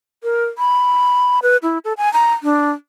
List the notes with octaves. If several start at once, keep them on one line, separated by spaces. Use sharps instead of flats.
A#4
B5
B4
E4
A4
G#5
A#5
D4